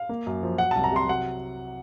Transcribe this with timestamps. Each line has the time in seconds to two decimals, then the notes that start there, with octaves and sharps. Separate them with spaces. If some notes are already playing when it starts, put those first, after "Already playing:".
Already playing: F5
0.09 A#3
0.26 F#2
0.43 F3
0.58 F#3 F#5
0.71 C2 A5
0.84 A#5
0.92 C3 C6
1.08 F#3 F#5